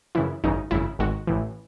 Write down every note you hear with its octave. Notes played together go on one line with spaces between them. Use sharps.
F#2 C#3 E3 E4
G#1 F#2 C#3 E3 D#4
G#1 F#2 C#3 E4
G#1 G#2 D#3 F#4
A1 A2 E3